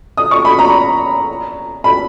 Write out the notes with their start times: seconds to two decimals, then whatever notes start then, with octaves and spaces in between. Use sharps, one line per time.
0.17 D#6
0.31 C#6
0.45 B5
0.59 A#5
1.84 B5